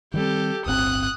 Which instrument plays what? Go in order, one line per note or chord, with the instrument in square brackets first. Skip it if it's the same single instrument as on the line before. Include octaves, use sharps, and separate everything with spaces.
[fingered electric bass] D#3 G3 C4 [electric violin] G4 A4
[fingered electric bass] D1 G1 C4 [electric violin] D#6 F#6